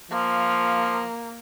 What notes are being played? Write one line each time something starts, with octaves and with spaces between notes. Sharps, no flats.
F3 A#3